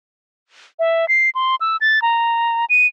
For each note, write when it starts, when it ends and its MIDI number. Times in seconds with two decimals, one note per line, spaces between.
0.79 1.08 76
1.08 1.30 96
1.35 1.56 84
1.61 1.77 88
1.81 2.02 93
2.02 2.65 82
2.70 2.87 99